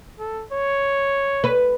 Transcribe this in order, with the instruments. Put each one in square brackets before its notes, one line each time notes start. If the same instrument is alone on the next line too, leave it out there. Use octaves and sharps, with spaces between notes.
[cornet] A4
C#5
[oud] B4